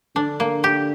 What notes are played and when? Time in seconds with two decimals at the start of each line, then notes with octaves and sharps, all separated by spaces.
0.16 D3 D4
0.40 A#3
0.64 G4